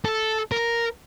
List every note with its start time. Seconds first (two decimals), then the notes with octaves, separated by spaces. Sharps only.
0.05 A4
0.52 A#4